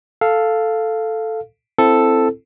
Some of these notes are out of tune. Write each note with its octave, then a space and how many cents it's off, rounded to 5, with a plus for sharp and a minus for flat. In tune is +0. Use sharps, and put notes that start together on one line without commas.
A4 +0 F5 +0
C4 +0 E4 +20 A4 +0